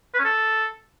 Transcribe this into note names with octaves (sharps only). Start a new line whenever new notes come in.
B4
C#4
A4